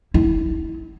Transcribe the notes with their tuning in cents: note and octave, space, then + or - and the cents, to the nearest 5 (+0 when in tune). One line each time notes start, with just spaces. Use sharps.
E4 -30